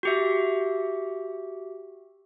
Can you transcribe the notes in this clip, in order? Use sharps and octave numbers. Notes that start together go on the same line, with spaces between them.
F#4 G4 E5